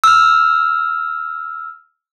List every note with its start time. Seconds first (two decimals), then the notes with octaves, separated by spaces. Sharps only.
0.04 E6 F6